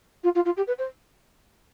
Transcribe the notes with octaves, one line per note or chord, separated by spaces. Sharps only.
F4
F4
F4
G4
B4
C5